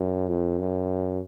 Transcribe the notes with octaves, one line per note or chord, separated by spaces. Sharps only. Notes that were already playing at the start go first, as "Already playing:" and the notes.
Already playing: F#2
F2
F#2